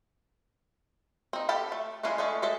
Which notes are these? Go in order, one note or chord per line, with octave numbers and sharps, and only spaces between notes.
C4 D#4
G4 A4 G5 A5 B5
A3
E3 G#3 C#4 E4 F4
G#3 A3 C#4 D4
G#3 A4 E5